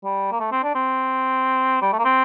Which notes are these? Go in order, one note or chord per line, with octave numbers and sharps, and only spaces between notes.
G3
A#3
A3
C4
D4
C4
G3
A3
A#3
C4